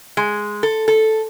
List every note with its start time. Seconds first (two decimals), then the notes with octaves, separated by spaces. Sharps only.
0.17 G#3
0.63 A4
0.88 A4